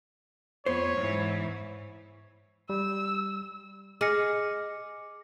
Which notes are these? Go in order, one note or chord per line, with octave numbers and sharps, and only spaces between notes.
F2 B3 C5 C#5
G#2 E3
G3 E6
G#4 D#5 D6 F6 A#6 C#7